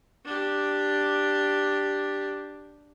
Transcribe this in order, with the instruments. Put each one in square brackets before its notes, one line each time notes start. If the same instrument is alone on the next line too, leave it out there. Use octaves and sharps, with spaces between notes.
[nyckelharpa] D4 G4